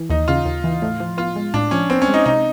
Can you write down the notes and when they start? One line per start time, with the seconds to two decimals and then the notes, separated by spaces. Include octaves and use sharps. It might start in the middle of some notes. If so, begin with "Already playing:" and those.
Already playing: E3
0.10 D#2 D#4
0.28 C#3 F4
0.45 D#2
0.64 E3
0.82 A2
1.00 F3
1.18 B3 F4
1.36 G#3
1.54 A2 D4
1.71 F3 C#4
1.90 B3 C4
2.02 C#4
2.08 G#3
2.14 D#4
2.26 C3 D#4